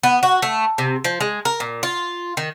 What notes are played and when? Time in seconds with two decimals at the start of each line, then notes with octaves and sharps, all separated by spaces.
0.03 B3
0.23 F#4
0.42 A3
0.78 C3
1.05 F3
1.21 G#3
1.45 A#4
1.60 A#2
1.83 F4
2.37 D#3